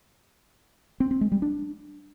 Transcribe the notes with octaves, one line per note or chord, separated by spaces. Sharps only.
C4
C4
G#3
G3
D4